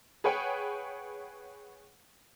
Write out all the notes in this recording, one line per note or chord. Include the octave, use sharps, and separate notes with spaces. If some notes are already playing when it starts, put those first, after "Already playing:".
G#4 B4 C#5 F#5 G5